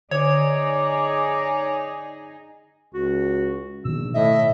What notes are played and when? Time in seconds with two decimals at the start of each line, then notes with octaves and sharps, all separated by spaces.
0.11 D3 D#4 G#4 C#5 D5
2.94 C#2 F#4
3.85 A#1 B2 D#3 E6
4.14 A2 D#5 E5